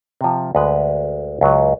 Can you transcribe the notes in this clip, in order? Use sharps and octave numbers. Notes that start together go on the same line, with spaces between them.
C3 F3
D2 G#3 B4
C#2 F#3